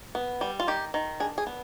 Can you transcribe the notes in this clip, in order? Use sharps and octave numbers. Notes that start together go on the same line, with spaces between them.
B3
G3
F4
D#3 G4
D#3
D4 G#4
G#4
B3